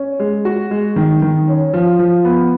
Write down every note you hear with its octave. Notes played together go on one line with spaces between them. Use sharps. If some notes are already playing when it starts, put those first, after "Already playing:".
Already playing: C#4
G#3
F#4
G#3
D#3
D#3
C#4
F3
F3
B3